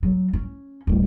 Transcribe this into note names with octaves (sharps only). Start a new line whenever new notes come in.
F#3
C#4
D1 G3